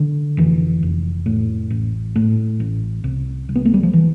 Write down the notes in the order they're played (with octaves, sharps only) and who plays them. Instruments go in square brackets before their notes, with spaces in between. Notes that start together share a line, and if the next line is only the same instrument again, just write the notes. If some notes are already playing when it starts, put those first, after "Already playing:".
Already playing: [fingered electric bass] D3
F1 E3
F1
A2
A1
A2
A1
C2
C2
B3
A3
G3
F3
E3